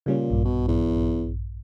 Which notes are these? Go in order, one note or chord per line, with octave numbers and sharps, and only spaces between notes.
A#2 C#3 G3 C#4
A#1 G2
B2
E2